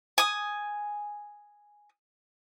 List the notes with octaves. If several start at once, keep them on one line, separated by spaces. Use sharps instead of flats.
G#5 D#6